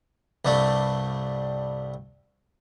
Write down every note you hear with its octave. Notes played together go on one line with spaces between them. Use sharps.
C2 G2 G3 A3